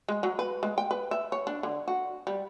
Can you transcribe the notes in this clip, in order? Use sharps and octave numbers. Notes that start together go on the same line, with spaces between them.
G#3
F#3
B4
G#3
G5
B4
E5
C#5
D4
D3
F#4
G3